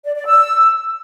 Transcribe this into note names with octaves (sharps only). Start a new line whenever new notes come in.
D5
D5
E6